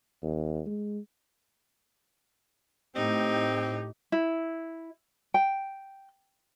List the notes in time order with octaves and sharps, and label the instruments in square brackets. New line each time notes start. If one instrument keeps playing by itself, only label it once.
[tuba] D#2
G#3
[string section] A2 [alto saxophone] C4 [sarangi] D#4 [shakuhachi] G4
[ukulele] E4
G5